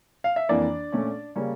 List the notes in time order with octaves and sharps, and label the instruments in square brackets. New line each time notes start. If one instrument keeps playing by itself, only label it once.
[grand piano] F5
E5
F2 E3 A#3 D4 D5
A#2 A3 C#4
C#3 G3 A#3 C#4